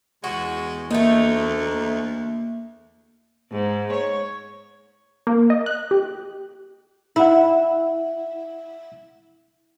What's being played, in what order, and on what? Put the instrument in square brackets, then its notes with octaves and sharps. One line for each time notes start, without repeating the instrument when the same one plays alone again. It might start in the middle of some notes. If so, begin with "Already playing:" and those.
[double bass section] E2 [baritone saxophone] G#3 [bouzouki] F#4
[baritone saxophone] D2 [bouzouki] A3 D#4 [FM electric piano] A#3 E5
[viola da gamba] G#2
C#5
[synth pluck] A#3
D#5
F#6
G4
[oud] E4 [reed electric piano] E5 F#5